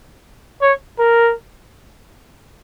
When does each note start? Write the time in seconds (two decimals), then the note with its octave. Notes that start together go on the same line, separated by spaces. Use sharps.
0.62 C#5
0.99 A#4